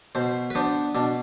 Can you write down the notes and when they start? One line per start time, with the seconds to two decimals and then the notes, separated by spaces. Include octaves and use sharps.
0.15 B2 C5
0.50 B4
0.55 B3 D4 C5
0.95 B2 D4